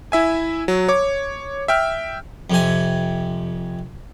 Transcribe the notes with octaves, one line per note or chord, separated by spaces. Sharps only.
E4 E5 G#5
F#3
C#5 D6
E5 G5 F6
F2 C3 G#5